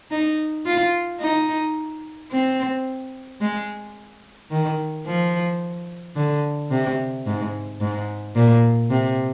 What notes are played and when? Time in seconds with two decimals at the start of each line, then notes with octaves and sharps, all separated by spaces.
0.11 D#4
0.66 F4
1.21 D#4
2.31 C4
3.41 G#3
4.51 D#3
5.06 F3
6.16 D3
6.71 C3
7.26 G#2
7.81 G#2
8.35 A#2
8.90 C3